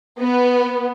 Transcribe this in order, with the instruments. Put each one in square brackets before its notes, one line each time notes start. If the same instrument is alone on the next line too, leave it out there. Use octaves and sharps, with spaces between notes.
[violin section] B3